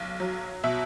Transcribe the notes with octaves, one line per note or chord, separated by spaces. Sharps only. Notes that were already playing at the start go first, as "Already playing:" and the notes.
Already playing: B1
F#3
B2 E5